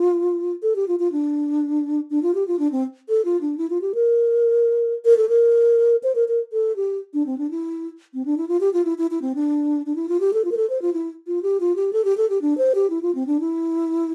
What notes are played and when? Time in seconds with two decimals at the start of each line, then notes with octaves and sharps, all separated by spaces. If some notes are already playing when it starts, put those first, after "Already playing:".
Already playing: F4
0.62 A4
0.76 G4
0.88 F4
0.99 F4
1.12 D4
2.10 D4
2.23 F4
2.35 G4
2.48 F4
2.59 D4
2.72 C4
3.09 A4
3.25 F4
3.41 D4
3.58 E4
3.70 F4
3.81 G4
3.94 A#4
5.05 A#4
5.17 A4
5.29 A#4
6.03 C5
6.15 A#4
6.28 A#4
6.53 A4
6.76 G4
7.14 D4
7.26 C4
7.38 D4
7.51 E4
8.14 C4
8.25 D4
8.37 E4
8.48 F4
8.61 G4
8.73 F4
8.85 E4
8.98 E4
9.11 E4
9.22 C4
9.35 D4
9.86 D4
9.96 E4
10.09 F4
10.20 G4
10.33 A4
10.44 F4
10.52 A#4
10.57 A4
10.70 C5
10.82 F4
10.94 E4
11.27 F4
11.43 G4
11.60 F4
11.76 G4
11.93 A4
12.05 G4
12.17 A4
12.30 G4
12.42 D4
12.58 C5
12.75 G4
12.90 E4
13.03 F4
13.15 C4
13.27 D4
13.40 E4